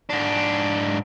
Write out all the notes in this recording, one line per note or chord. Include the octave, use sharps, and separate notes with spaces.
G#2 D4